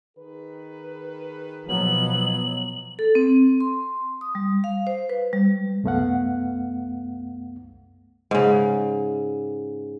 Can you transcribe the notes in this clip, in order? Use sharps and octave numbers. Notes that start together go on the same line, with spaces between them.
D#3 G#4 B4
B2 F3 F#3 B3 F#7
A4
C4
C6
D#6
G3
F5
C5
B4
G3
C2 F#2 A3 B3 F5 F#5
G#2 C#3